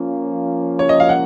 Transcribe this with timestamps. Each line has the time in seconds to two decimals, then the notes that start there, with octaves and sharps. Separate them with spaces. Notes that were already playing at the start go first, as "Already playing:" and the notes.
Already playing: F3 A#3 C#4
0.79 C#5
0.89 D#5
1.00 F5
1.09 F#5